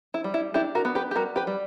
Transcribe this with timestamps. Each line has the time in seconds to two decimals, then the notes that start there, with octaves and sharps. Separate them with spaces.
0.14 E4
0.24 G3
0.34 E4
0.54 D4 E4 G4
0.75 F#4 A#4
0.85 B3
0.95 G4 B4
1.11 G4
1.16 G3 F#4 A#4
1.36 G4 B4
1.47 G3